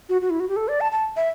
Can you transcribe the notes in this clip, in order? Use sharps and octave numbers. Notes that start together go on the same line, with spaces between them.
F#4
F#4
E4
F#4
G4
A4
D5
A5
A5
E5